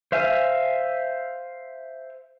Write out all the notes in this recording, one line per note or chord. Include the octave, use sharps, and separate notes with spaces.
C5 E5 F5 G#5